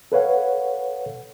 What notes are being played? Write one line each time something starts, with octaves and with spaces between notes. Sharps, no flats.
A4 B4 C#5 F5 F#5